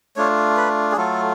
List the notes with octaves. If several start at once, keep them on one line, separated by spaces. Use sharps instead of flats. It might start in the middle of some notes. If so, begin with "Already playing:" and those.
A3 D4 F4 C#5
B4
G#4
F#3 A3 F4 A4